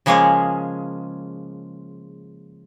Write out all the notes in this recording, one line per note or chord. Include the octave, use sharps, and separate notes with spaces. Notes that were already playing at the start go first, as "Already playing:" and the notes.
C#3 F3 G#3 A#3 C#4 G#4